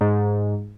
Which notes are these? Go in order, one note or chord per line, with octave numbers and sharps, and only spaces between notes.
G#2